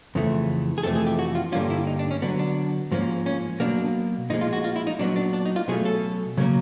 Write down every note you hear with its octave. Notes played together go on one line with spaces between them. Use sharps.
F2 C#3 E3 A3
G#4
F2 C3 E3 A3 A4
G#4
G4
F#4
F4
G2 D3 G3 A#3 C#4 F4
E4
D#4
D4
C#4
D3 F#3 B3 D4
D4
G#2 F3 A#3 C#4
C#4
B2 F#3 A#3 D4
A#2 F3 G#3 D#4
F4
F#4
F4
E4
D#4
A#2 F#3 B3 D4
D4
D4
D#4
F4
B2 F#3 A3 C#4 G#4
A4
C#3 F#3 A#3 C#4